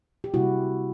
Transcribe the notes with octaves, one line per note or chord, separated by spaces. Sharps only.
G4
C3 E3 G3 A#3 E4 F#4